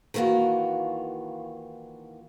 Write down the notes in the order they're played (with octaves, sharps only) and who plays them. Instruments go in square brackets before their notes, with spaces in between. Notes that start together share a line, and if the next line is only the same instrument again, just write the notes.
[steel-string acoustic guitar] D#3 E3 A#3 F4 F#4